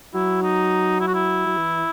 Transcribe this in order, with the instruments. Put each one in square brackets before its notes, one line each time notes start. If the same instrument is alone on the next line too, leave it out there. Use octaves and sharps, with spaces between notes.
[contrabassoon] F#3 [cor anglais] E4
[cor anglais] D#4
E4
F#4
E4
[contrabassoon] F#3
E3